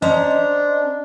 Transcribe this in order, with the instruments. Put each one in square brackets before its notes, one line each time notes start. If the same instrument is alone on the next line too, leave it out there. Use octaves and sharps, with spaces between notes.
[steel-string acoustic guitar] C#4 C5 A#5 [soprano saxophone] D4 [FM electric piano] D#5 C6